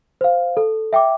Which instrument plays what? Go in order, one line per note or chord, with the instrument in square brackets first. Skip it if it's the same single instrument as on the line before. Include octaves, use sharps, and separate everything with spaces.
[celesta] C5 F5
A4
E5 G5 D6